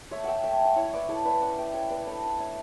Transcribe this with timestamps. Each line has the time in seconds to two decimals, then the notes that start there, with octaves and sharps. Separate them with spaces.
0.11 A3 C#5 E5
0.24 E5 F#5 G5
0.43 A3 E5 G5
0.65 F#5
0.76 E4 C#5 E5
0.93 B4 D5
1.08 E4 A4 C#5
1.25 B4 D5
1.41 C#4 D5 F#5
1.58 E5 G5
1.74 C#4 C#5 E5
1.90 B4 D5
2.07 D4 A4 C#5
2.39 A3 C#5 E5